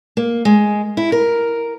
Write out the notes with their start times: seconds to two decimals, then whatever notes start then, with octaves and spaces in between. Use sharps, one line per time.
0.17 A#3
0.45 G#3
0.97 E4
1.12 A#4